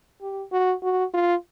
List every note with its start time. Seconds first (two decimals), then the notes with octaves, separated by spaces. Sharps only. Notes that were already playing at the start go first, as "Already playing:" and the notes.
0.22 G4
0.52 F#4
0.83 F#4
1.14 F4